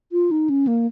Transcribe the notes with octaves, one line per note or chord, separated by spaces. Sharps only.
F4
D#4
C#4
A#3